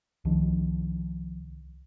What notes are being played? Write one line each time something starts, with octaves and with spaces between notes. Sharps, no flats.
C2 D#3 F3